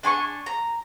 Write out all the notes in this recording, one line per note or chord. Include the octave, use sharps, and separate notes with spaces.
D4 G#5 C6 C#6
A#5